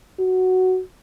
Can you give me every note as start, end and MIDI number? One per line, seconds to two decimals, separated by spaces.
0.19 0.81 66